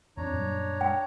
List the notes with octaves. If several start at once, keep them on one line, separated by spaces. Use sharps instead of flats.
E2 C4 D4 C#5 A#5
F#2 A#2 G3
G5